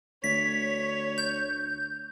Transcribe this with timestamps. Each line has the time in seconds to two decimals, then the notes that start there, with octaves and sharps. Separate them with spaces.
0.24 D2 C#5 B6
1.18 G6